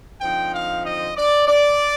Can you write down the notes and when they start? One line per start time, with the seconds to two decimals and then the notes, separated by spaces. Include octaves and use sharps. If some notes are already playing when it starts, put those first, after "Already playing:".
0.21 D3 F3 C4 D#4 G5
0.54 F5
0.85 D#5
1.17 D5
1.47 D5